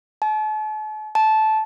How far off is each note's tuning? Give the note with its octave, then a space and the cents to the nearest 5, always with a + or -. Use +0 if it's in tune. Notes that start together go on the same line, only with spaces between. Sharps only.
A5 -40
A5 -15